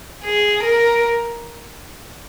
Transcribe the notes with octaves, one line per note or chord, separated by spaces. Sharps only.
G#4
A#4